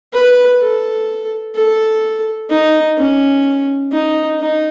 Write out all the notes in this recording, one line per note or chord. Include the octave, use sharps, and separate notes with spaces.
B4
A4
A4
D#4
C#4
D#4
D#4